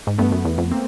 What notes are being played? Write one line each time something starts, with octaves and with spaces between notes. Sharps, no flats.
G#2
G2 A3 B3
F#2
E2
F2
A#3 C4